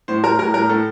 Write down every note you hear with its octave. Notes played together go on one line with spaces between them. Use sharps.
A2 C5
A2 A#4
A2 A#4
A2 A#4
A2 A4